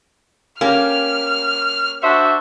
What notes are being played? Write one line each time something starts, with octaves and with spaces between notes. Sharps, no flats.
A#3 C#4 G4 F6
D4 F#4 C5 E5